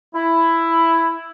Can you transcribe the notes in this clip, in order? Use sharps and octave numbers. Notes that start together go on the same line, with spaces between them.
E4